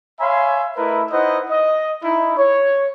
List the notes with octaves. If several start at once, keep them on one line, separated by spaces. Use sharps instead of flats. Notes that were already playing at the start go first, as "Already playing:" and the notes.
C#5 E5 F5 G#5 B5 C6
A3 E4 A#4 B4 D#5 E5
D#4 E4 B4 C5 D#5 F#5
D#5
D#4 E4
C#5